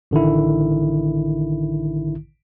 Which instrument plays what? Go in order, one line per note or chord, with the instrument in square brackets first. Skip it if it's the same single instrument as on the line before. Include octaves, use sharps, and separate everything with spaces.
[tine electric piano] A1 D3 D#3 E4